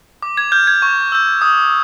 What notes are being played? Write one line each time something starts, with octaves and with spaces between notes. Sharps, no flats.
D6
G#6
F6 G6
G#6
C#6
E6 G6
D#6